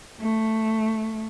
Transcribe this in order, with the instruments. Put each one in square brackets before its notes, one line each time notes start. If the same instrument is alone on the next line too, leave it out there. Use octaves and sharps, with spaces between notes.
[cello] A3